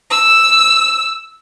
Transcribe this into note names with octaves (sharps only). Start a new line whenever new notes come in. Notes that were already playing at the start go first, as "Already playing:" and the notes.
E6